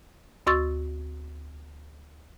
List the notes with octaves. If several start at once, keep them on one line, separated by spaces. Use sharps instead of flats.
D2 F#4 C6 C#6 E6 A6